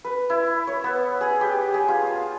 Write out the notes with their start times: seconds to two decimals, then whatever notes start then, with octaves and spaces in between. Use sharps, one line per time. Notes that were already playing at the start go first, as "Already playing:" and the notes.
0.04 B4
0.30 E4
0.67 C#5
0.84 B3
1.21 G#4
1.41 G4
1.74 G#4
1.88 F4
2.07 A5